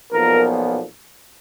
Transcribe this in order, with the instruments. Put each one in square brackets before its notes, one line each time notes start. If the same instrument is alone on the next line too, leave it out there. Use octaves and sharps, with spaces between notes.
[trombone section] B1 A#2 F3 B3 A#4